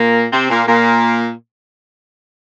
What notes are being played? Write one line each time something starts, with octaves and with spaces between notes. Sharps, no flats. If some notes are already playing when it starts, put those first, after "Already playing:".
Already playing: A#2 A#3
C3 C4
A#2 A#3
A#2 A#3